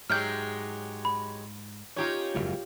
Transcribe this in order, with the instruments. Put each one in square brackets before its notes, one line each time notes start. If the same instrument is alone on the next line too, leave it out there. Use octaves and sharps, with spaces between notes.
[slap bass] G#2 [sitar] F#3 G#3 G4 [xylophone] F6 G6
[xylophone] B5
[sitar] C#4 D#4 [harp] F4 G4 C#5
[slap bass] F#1 F2 G#2